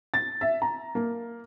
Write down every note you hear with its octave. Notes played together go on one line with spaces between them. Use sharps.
A6
E5
A#5
A#3